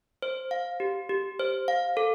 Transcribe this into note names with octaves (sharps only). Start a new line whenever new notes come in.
C5
F5
G4
G4
C5
F5
A4